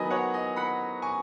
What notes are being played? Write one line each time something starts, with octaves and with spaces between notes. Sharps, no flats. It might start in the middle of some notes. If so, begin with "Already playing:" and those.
Already playing: D#3 F#3 B3 D#5 G#5 B5
C#5 F#5
D#5 G#5
F#5 B5
G#5 C#6